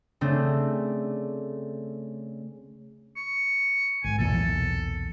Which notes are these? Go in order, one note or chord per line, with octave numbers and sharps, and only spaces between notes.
C#3 A3 C4 D4
C#6
G#1 G#5
B1 E2 A#2 A4